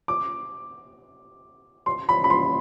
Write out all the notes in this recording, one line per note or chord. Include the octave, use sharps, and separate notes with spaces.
D6
C6
B5
B5
C6